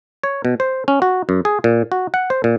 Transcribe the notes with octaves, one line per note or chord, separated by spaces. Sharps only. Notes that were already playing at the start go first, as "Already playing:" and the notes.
C#5
B2
C5
C#4
F#4
F#2
G#4
A#2
F#4
F#5
C5
A#2